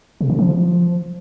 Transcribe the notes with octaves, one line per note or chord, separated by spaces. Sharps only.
C3
D3
F3